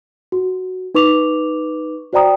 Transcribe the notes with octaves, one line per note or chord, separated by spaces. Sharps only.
F#4
D#4 B4 C#6 D6 F7
F#4 C5 D5 G5 A#5 D#6